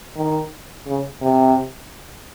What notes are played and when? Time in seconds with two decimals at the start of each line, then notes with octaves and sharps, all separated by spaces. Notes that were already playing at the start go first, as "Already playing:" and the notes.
0.16 D#3
0.86 C#3
1.22 C3